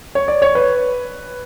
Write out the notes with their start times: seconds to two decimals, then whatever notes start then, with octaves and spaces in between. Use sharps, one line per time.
0.15 C#5
0.28 D5
0.42 C#5
0.55 B4